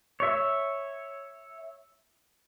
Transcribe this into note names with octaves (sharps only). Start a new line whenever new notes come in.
C#5 E5